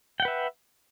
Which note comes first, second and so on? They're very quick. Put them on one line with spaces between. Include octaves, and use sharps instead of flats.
G5 F#5 B4 E5